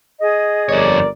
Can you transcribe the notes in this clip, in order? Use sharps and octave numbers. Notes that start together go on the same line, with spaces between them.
G#4 D#5
G1 F2 A#4 C#5 D5